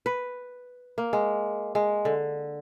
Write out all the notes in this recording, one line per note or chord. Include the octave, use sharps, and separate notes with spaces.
B4
A#3
G#3
G#3
D3